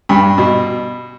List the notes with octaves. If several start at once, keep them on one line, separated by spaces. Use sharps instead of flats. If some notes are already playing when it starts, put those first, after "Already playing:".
G2
B2